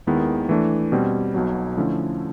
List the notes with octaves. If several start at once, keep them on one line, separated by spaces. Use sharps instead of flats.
D#2 D#3 G#3 B3 E4
E3 A3 D4
B2 G3 C4
B1 B2 F#3
D3 F3 A3 C#4 E4